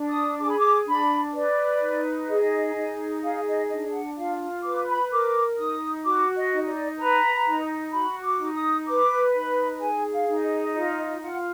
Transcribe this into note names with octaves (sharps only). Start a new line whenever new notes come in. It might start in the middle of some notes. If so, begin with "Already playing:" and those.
Already playing: D4
D#6
G#4 D6
B5
D6
D4 B5
B4 D5
D#4
G#4 D#5
D#4
G#4 F5
D#5
D4 D#5
F#5
F4 F5
B4 D6
B5
A#4 D6
D#4 D#6
F#4 D6
D#5
D#4
D5
B4 A#5
D#4
F#4 B5
D6
D#4
D#6
B4 D6
D#4 B5
G#4 G#5
F5
D#4
D#5
F4 D#5
D#5
F4 F#5